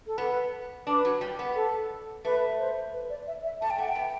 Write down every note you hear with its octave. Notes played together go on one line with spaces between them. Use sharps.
A4
B3 B4
D4 B4
F#3
G3
B3
A4
A3 B4
C5
B4
D5
E5
E5
A3 A5
G5
A3 F#5
G5
B3